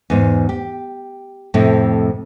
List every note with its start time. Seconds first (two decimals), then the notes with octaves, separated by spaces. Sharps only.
0.10 E2 G#2
0.49 G4
1.54 F2 A2 C3